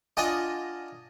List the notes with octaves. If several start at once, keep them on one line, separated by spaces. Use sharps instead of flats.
D4 F4 D#5 F#5 G#5